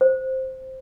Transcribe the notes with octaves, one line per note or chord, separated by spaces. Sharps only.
C5